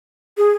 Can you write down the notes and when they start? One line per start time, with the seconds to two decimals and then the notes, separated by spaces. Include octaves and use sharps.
0.37 G#4